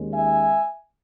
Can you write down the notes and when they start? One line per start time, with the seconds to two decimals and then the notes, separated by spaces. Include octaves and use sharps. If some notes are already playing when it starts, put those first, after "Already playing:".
Already playing: D#2 D#3 G#3 C#4
0.12 E5 G#5